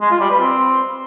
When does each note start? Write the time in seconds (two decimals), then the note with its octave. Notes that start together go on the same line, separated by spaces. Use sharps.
0.01 G#3
0.11 F4
0.21 G3
0.30 B4
0.40 C4